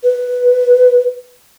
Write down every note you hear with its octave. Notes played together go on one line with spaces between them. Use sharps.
B4